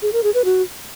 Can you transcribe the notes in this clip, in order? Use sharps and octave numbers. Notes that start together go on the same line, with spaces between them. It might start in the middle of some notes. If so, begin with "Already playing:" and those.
G#4
A#4
G#4
B4
F#4